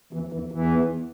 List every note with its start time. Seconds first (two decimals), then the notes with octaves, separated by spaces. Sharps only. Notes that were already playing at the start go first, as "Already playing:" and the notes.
0.13 E2 E3
0.32 E2 E3
0.52 E2 E3